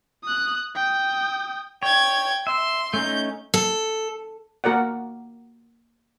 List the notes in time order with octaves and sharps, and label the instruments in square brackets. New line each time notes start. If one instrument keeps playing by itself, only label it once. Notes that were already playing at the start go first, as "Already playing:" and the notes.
[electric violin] D#6 F#6
G5 D#6
[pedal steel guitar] C#5 [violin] G5 G#6
[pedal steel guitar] E5 [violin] C6
[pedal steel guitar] A3 C#4 D#4 [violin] G6
[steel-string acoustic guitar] A4
[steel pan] A#3 F#4 A#4 D5 F#5